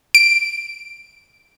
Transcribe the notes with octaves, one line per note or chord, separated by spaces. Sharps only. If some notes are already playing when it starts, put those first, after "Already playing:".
D7